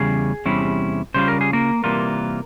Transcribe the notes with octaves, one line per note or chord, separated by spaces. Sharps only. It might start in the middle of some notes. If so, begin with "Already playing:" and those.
Already playing: E2 C#3 G3 C#4 G#4
E2 C3 G3 C#4 E4
C#3 G3 C#4 F4 C5
A#4
G#4
A#3 A#4
C3 E3 G3 A#3 F4